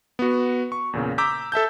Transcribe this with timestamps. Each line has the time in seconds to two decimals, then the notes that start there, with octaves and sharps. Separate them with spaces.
0.19 B3 F#4
0.72 C#6
0.93 E2 A#2 C#3
1.18 A#5 D6 E6 G6 B6
1.52 A4 E5 A5 G6